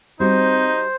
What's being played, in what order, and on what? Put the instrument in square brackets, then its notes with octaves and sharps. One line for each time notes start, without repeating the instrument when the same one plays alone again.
[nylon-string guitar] G3 F#4 [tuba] C4 [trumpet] D#4 [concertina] C5